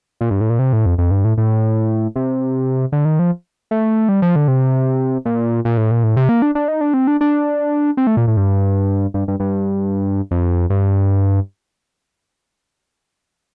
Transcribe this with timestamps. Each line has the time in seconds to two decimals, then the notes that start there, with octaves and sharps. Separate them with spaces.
0.21 A#2
0.31 G2
0.41 A2
0.50 A#2
0.59 C3
0.73 A2
0.86 F2
0.98 F2
1.11 G2
1.25 A2
1.38 A2
2.16 C3
2.92 D3
3.05 D#3
3.19 F3
3.71 A3
4.09 G3
4.22 F3
4.36 D3
4.48 C3
5.25 A#2
5.65 A#2
5.77 A2
5.91 A#2
6.04 A2
6.17 C3
6.29 A#3
6.42 D4
6.55 D4
6.68 D#4
6.81 D4
6.94 C4
7.07 D4
7.21 D4
7.97 C4
8.07 A3
8.17 A#2
8.28 A2
8.37 G2
9.14 G2
9.28 G2
9.40 G2
10.31 F2
10.70 G2